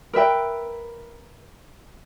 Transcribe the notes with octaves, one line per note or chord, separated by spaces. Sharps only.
A#4 B4 E5 G5